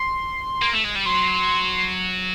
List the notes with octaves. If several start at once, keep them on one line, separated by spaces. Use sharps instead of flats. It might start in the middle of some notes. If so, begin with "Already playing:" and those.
Already playing: C6
A#3
A3
G#3
G3
F#3 C6